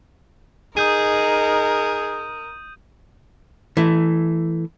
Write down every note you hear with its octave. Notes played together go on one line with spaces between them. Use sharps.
D#4 G#4 A#4 D#6 G6 D#7
E3 A3